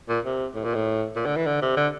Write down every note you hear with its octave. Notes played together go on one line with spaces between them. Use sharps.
A#2
C3
A2
A#2
A2
A#2
D3
E3
D3
C3
D3